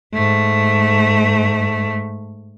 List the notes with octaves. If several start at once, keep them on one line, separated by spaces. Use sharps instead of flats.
G#2 A3